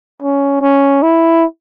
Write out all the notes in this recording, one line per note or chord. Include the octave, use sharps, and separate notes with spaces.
C#4
C#4
E4